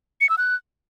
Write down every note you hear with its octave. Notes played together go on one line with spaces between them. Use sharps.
C#7
E6
F#6